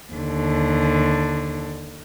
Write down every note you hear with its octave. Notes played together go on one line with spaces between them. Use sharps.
D#2 D3